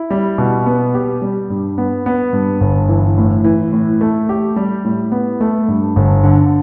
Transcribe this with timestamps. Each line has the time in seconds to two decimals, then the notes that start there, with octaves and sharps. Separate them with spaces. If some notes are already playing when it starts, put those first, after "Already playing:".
Already playing: E4
0.10 G3
0.38 B2
0.66 B3
0.94 G4
1.22 G3
1.50 G2
1.78 B3
2.06 B3
2.33 G2
2.61 G1
2.89 E3
3.18 A2
3.44 E3
3.73 A2
4.01 A3
4.29 G4
4.56 G3
4.84 A2
5.12 B3
5.41 A3
5.68 G2
5.96 G1
6.24 D3